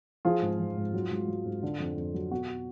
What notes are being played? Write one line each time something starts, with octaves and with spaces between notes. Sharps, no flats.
F3 F4 G#4
G#2
F3
G#2
F#3
G#2
F#3
G#2
D3
F2
F2
F#3
B2 F#4